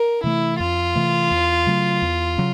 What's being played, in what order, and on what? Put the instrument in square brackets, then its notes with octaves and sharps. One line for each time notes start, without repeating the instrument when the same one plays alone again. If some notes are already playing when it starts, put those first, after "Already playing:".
Already playing: [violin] A#4
[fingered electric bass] C3 E3 A3 [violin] E4
[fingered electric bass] F2 [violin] F4
[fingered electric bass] C3 E3 A3
E2
C#3 F#3 A3
E2
C#3 F#3